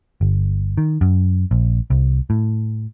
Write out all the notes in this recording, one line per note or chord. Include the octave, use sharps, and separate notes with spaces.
G1
D#3
F#2
A#1
C2
A2